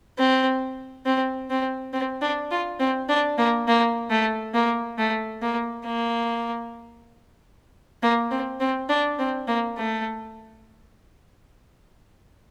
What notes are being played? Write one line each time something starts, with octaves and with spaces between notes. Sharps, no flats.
C4
C4
C4
C4
D4
F4
C4
D4
A#3
A#3
A3
A#3
A3
A#3
A#3
A#3
C4
C4
D4
C4
A#3
A3